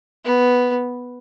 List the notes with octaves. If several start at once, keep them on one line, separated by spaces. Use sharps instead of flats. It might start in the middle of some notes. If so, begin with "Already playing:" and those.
B3